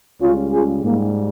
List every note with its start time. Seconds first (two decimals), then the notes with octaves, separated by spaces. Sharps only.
0.21 C#2 C#3 G3 C#4 F4
0.52 F4 G#4
0.84 G#2 G3 A#3